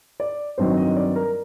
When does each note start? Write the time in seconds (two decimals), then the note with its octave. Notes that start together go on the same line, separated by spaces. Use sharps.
0.20 D5
0.58 G2 D#3 F#3 C4 D#4 C5
0.77 D#5
0.96 D5
1.16 A#4